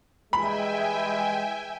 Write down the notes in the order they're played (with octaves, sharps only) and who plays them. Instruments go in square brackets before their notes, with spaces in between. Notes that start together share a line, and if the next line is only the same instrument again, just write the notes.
[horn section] E3 G3 G#3 [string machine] E5 G5 G#5 [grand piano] B5